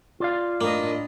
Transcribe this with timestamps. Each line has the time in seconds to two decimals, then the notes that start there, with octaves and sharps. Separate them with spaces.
0.20 F4 D5 F5
0.61 A2 A#3 D4 D#5